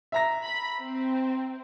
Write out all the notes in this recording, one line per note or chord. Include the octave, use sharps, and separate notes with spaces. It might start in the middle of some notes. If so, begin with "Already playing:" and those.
E5 A#5 A#6
B5
C4